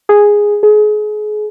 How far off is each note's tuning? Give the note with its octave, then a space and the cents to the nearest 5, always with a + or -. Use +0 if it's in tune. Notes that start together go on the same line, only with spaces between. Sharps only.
G#4 -5
G#4 +30